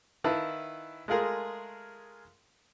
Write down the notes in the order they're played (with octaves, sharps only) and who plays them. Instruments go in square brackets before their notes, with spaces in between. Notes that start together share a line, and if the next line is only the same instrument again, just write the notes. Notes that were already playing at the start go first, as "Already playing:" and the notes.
[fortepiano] D#3 E4 B4 F5 A5
G#3 A3 F4 G#4 A#4